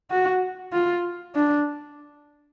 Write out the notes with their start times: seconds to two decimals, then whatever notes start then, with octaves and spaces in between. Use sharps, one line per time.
0.10 F#4
0.73 F4
1.35 D4